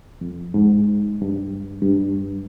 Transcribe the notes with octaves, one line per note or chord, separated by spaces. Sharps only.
F2
G#2
G2
G2